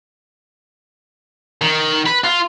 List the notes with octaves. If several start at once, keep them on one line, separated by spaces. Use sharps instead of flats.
D#3
B4
F4